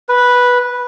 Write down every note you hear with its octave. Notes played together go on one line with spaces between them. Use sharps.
B4